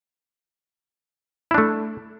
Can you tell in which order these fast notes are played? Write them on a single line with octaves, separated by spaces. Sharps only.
E4 D4 A3